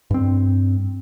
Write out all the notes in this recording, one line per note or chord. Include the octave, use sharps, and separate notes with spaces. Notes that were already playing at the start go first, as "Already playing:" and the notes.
G2 C4